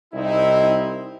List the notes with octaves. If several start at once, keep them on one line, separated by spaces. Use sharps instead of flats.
C2 C4 D#4 E4